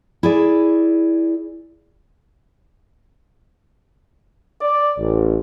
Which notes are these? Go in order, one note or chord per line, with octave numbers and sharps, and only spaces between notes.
E4 G#4 D5
D5
A1